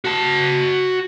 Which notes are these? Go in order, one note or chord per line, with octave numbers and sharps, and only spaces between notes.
F#4 A5